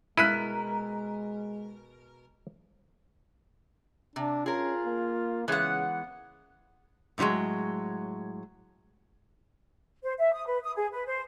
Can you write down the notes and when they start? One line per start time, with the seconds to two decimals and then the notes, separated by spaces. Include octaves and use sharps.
0.18 B2 G#3 E4 A#4 F#6 B6 D#7
4.16 C3 D4
4.46 C#4 F4 G#4 A#4
4.85 A#3
5.48 C#3 E3 G#3 B3 F#5
7.18 A2 D3 F3 F#3 G#3
10.03 C5
10.19 E5
10.34 D#6
10.46 B4
10.63 D#6
10.76 G#4
10.93 B4
11.06 C5